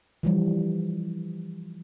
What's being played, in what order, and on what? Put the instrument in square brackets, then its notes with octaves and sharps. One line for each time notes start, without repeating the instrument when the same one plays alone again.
[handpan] E3 F3 G3